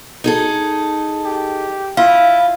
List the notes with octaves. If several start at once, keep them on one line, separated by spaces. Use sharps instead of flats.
D#4 G#4 A4
G4
E4 F4 F5